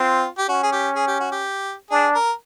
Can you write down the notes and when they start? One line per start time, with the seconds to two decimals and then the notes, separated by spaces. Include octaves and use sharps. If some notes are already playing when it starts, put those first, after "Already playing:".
Already playing: C4 F4
0.38 G4
0.49 C#4 F#4
0.63 G#4
0.73 G4
0.96 G#4
1.08 G4
1.20 F#4
1.32 G4
1.91 D4 G#4
2.15 A#4